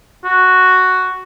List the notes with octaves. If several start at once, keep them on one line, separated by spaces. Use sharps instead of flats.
F#4